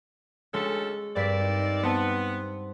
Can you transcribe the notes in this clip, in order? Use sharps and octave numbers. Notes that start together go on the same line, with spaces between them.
D2 G#3 C#4 A4
G2 C4 A#4 D5 B6
D#4
B3 C4 A5 A6